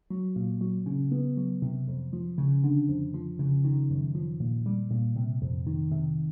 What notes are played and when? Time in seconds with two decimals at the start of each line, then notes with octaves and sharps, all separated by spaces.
0.10 F#3
0.36 A#2
0.61 F#3
0.86 C#3
1.12 B3
1.37 F#3
1.62 C3
1.88 F2
2.13 F3
2.38 C#3
2.64 D3
2.89 F2
3.14 F3
3.39 C#3
3.65 D#3
3.90 F#2
4.15 F3
4.40 A#2
4.66 G3
4.91 A#2
5.16 C3
5.42 F2
5.67 D#3
5.92 C3